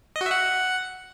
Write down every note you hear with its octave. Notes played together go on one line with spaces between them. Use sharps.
D#5
F#4
E5
F#5